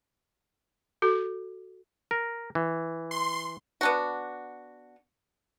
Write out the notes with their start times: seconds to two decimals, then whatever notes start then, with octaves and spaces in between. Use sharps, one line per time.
1.02 F#4 A4
2.11 A#4
2.55 E3
3.11 C6
3.81 B3 D4 F#4